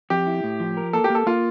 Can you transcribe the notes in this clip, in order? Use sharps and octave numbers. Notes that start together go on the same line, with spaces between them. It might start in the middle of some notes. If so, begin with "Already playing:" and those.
F2 G4
E4
A2
F3
A#4
A#3 A4
G4
A#3
A4
A#3 F4